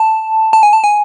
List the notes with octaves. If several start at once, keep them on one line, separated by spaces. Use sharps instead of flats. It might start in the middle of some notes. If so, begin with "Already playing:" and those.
Already playing: A5
A5
G#5
A5
G#5